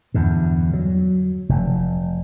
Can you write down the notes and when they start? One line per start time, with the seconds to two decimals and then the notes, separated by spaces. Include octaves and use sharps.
0.14 E2 G2 D3
0.73 F#3
1.49 F1